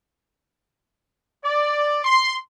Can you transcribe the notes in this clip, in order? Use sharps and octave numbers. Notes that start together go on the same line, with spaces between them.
D5
C6